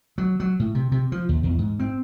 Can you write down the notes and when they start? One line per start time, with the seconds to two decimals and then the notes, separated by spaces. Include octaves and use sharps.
0.18 F#3
0.40 F#3
0.59 A2
0.75 C3
0.92 C3
1.12 F3
1.29 D#2
1.43 E2
1.58 G#2
1.79 C4